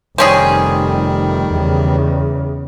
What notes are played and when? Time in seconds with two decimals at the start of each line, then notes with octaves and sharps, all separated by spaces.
0.18 F1 D#3 G3 C4 C#4 G#4
1.52 E2 C#3